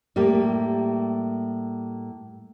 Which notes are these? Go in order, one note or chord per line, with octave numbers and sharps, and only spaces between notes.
A2 G3 A#3 G4